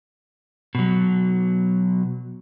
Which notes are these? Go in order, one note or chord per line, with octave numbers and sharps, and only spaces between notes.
B2 F#3